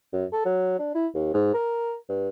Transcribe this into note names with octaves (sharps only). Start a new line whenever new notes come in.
F#2
A4
F#3
D4
E4
D#2
G#2
A#4
G2